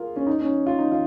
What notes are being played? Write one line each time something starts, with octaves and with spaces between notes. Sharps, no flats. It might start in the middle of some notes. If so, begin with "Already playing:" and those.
Already playing: F4 G#4 A#4
C#4
D#4
C#4
F4
D#4
F4